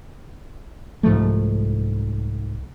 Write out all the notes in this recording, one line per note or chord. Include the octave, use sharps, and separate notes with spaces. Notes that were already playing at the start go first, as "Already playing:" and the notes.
C2 G#2 F3 A3